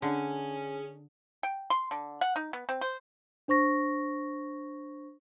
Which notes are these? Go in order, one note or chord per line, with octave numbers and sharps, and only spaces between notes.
D3 C#4 G#4
G5
C6
D3
F#5
D#4
B3
C4
C5
D4 C5 C#6 A#6